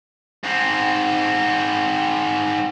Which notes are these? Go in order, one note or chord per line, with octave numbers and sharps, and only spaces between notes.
G#2 C4